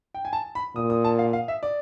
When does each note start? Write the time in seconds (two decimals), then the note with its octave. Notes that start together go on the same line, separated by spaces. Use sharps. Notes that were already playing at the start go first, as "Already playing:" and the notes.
0.14 G5
0.25 G#5
0.33 A5
0.55 B5
0.76 A#2 D#6
0.90 D#6
1.04 A5
1.19 F5
1.33 F5
1.48 E5
1.63 D5